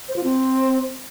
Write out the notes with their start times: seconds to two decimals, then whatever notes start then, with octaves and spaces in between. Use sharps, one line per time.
0.09 C5
0.16 F4
0.24 C4